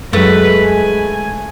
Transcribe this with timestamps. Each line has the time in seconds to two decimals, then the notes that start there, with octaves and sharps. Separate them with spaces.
0.13 F#2 F#3 G#3 A3 B4
0.65 G#5